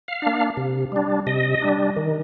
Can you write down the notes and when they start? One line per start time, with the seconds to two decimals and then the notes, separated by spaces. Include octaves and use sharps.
0.08 F5
0.22 A#3 D4
0.57 C3
0.92 G3 D4
1.27 C3 D#5
1.62 G3 D4
1.96 D#3